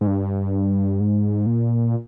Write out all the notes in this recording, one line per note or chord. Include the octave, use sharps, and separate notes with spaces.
G#2
G2
G#2
A#2